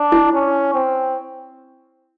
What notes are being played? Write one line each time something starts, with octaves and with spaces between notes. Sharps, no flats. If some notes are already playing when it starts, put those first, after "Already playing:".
Already playing: D4
E4
C#4
C4